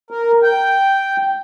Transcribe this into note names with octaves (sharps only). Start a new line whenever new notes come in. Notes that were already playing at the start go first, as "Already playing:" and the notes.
A#4
G5